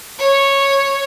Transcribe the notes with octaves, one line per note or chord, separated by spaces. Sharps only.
C#5